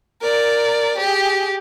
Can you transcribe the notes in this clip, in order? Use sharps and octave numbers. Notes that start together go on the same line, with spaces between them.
A#4 D5
G4 G#4